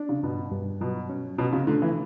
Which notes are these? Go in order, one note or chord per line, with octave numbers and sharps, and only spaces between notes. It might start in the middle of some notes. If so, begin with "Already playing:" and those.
Already playing: D4
C#3
G2 B2
G2
B2 F#3
C#4
B2 C#4
C#3
D3 A3
E3